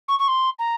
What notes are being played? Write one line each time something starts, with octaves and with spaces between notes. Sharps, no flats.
C#6
C#6
C6
A#5